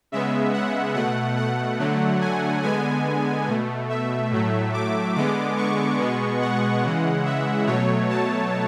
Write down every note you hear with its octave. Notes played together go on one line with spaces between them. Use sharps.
C#3 G#3 B3 E5
F#5
B2 A3 F#5
F#5
D3 F#3 A3
G#5
D3 G#3 B3 G#5
B2 A3
E5
A2 F#3 A3
D6
D3 G#3 B3 D6
C#6
B2 G#3 B3
F#5
C#3 E3 G#3
E5
B2 F#3 A3 C#5
A5